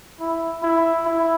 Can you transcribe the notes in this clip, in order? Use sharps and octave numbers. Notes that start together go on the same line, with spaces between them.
E4
E4
E4